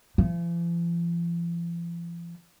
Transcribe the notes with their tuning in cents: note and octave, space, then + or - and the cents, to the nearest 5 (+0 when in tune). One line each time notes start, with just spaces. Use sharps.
F3 -45